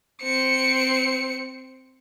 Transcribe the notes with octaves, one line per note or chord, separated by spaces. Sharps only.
C4 C#7